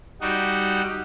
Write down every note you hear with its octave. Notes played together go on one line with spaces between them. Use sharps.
G3 D#4 F#4